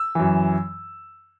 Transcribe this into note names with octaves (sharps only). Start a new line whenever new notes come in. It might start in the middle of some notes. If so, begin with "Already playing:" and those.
Already playing: E6
F#2 E3